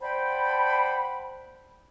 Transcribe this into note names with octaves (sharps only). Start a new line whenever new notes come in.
C5 D5 F#5 G5 A5 B5